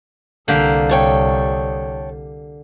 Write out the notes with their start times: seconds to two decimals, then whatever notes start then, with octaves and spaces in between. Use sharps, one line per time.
0.48 C2 D3 A#3 G4
0.89 A4 C#5 G5